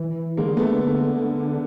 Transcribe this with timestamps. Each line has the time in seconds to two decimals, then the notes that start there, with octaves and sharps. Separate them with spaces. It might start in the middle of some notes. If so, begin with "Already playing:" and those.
Already playing: E3
0.37 D3 G#3 A#3
0.57 A3 B3